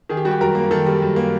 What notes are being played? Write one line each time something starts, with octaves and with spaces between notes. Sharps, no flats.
D#3 G#4
G4
G3 F#4
G4
F#2 A#4
A#3
D#3 A4
G3
F#2
A#3